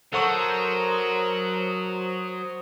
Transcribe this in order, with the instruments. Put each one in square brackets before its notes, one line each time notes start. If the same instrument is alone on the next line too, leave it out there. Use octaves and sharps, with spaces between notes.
[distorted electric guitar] F#3 [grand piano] A4 F#5 C#6 [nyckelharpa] A#4 A#5 [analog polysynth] C5 D#6